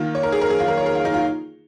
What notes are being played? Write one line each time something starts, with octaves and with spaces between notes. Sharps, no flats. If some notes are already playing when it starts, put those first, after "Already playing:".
Already playing: D#3 A#3 F4
C#5
A#4
G#4
A#4
G#4
F4
A#4
C#5
A#4
F4
D#4
F4